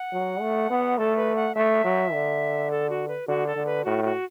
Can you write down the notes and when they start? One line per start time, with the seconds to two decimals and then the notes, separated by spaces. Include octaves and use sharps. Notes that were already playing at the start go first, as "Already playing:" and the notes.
Already playing: F#5
0.12 F#3
0.40 A3
0.70 B3
0.98 A3 A4
1.17 B4
1.36 F#5
1.55 A3 E5
1.84 F#3
2.12 D3
2.71 A4
2.90 F#4
3.08 B4
3.28 D3 F#4
3.47 A4
3.56 D3
3.66 B4
3.84 A2 F#4
4.04 F#4